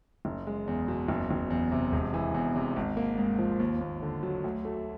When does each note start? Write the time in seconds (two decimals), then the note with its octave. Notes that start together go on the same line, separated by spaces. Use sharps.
0.25 F#1
0.47 G#3
0.67 E2
0.88 B2
1.08 F#1
1.31 F#1
1.50 E2
1.72 C3
1.92 E1
2.14 E3
2.34 E2
2.56 C3
2.76 G#1
2.97 A#3
3.18 G#2
3.39 F3
3.60 D#2
3.81 D#2
4.02 D3
4.23 F#3
4.44 D2
4.65 A3